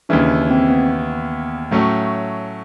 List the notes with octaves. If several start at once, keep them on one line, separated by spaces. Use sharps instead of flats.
D#2 C#3 E3 D4
C4
B3
A2 F#3 A3 C#4